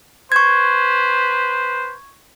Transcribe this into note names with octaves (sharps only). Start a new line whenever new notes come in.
B4 C5 C#6 G#6